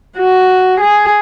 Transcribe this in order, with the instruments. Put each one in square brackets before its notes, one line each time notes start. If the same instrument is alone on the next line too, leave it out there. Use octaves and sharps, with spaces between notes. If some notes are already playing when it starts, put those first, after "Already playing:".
[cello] F#4
G#4